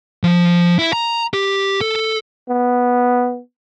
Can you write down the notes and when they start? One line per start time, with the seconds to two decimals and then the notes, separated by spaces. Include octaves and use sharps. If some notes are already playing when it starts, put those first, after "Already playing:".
0.24 F3
0.79 E4
0.93 A#5
1.34 G4
1.81 A4
2.49 B3